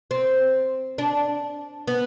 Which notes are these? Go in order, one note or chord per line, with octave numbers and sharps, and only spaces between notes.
C4
D4
B3